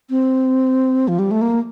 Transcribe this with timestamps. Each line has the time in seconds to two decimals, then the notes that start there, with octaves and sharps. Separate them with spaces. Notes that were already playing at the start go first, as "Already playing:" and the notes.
0.10 C4
1.08 F3
1.19 G3
1.31 A3
1.41 A#3